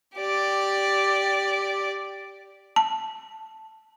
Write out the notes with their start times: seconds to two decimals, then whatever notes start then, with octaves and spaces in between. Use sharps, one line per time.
0.17 G4 D5
2.76 A5